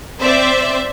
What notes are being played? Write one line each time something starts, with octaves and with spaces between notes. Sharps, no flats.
C4 C5 D5 E5